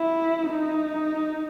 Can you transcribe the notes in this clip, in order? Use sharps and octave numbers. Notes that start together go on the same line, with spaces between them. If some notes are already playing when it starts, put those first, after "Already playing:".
Already playing: E4
D#4